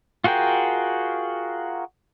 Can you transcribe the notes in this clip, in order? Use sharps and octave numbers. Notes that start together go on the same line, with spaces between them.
F4 F#4 G#4 A#4 G5